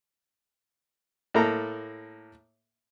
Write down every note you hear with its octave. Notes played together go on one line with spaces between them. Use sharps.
A2 A#3 A4 A#5 F6